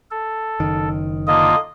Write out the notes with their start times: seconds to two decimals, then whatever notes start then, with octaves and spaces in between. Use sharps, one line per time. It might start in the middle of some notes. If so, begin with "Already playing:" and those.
0.11 A4
0.60 F#1 D#3
1.28 D3 A#3 F4 D#5